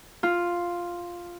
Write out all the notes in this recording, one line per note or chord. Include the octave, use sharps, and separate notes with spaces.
F4